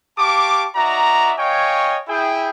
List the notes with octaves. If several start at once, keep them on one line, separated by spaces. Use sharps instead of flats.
G4 F5 A5 C#6 D6
D#4 F#4 D5 E5 A#5
C#5 D#5 F5 G5 G#5 C#6
E4 G#4 G5